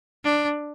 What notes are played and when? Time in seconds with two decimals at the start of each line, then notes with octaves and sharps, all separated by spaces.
0.24 D4